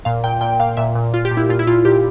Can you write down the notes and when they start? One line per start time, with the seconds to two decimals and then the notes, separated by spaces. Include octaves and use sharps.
0.05 A#2 F5
0.24 A#2 G5
0.41 A#2 G5
0.60 A#2 F5
0.77 A#2 E5
0.95 A#2
1.13 A#2 F4
1.25 G4
1.31 A#2
1.37 E4
1.49 A#2 F4
1.59 E4
1.67 A#2 F4
1.85 A#2 G4